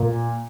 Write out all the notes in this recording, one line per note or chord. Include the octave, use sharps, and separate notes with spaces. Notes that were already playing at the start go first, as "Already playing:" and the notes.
Already playing: A#2